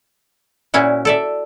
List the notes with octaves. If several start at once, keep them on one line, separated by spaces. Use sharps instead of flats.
A#2 C#4 E4 F#4
A4 D5 E5